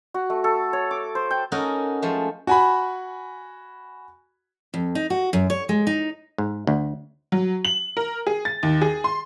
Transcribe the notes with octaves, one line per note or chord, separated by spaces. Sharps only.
F#4
A3
A4
C#5
D6
C5
G5
C#4 D#4 F#4 A4 A#4
F3 G#3 A3
F#4 G#5 B5
F2
D#4
F#4
F#2
C#5
G#3
D#4
G#2
D2
F#3
F#7
A#4
G#4
A6
D#2
G#4
C6